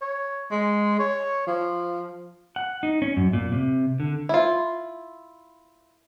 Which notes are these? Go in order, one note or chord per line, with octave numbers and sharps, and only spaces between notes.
C#5
G#3
C#5
F3
F#5
D#4
C#4
F#2
A#2
C3
D3
E4 F4